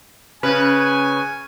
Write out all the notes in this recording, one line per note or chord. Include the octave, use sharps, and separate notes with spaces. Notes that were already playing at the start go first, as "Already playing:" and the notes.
C#3 B4 G#5